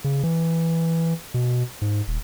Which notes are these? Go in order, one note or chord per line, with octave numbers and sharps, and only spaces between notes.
C#3
E3
B2
G#2
D#1